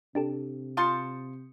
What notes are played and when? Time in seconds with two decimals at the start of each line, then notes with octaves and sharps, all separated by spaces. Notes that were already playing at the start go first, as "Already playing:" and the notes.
0.15 C3 D4 G4 A4
0.77 F4 A5 C6 D#6 G6 C#7